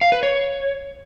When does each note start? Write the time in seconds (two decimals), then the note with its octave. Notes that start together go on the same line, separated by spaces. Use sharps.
0.01 F5
0.12 B4
0.23 C#5